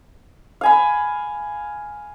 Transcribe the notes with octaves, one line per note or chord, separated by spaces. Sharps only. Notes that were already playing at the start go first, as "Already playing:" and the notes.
F5 G#5 B5